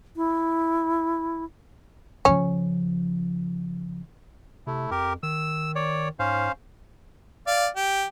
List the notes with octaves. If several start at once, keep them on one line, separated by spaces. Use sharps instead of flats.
E4
C#3 F3 C#4
C3 A3 E4
F2 G4 A#4
D#3 E6
C#5 D5
G#2 C#4 C5 F5
D5 F5
G4